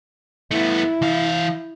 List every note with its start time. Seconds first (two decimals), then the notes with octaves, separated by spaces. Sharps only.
0.51 A3 B3 E4
1.02 E3 F5